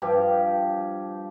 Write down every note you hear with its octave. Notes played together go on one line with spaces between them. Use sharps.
G2 F3 G4